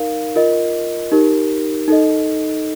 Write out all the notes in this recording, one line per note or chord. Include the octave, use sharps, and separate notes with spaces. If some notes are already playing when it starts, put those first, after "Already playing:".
Already playing: D#4 A#4 F5
F4 A#4 D#5
D#4 G4 A#4
D#4 A4 D#5